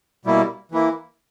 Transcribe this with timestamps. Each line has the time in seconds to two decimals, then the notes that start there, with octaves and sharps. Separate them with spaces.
0.25 B2 G3 A#3 E4
0.72 E3 A#3 E4